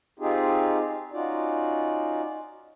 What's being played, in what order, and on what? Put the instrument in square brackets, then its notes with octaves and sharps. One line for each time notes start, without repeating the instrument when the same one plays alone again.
[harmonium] C4 D#4 F4 G4 G#4
C#4 D#4 F4 F#4 D5